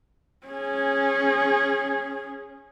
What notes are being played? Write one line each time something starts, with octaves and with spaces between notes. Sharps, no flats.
C#4 G#4